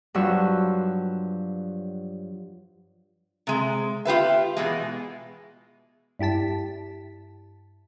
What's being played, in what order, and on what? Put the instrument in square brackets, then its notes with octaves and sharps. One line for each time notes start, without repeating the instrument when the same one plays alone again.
[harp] G2 F3 F#3 B4 C#6 E6
[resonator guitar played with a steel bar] C3 G#3
F4 G4 B4 E5
B2 E3 G#3
[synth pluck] G2 E4 G4 A5 B6